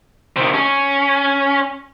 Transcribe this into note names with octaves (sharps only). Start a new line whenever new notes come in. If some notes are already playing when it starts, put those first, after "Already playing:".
C3 D#3
C#4